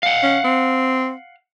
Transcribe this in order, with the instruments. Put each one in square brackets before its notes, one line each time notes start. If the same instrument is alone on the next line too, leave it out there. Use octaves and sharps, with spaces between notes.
[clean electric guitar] F5 F#5
[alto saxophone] C#4
C4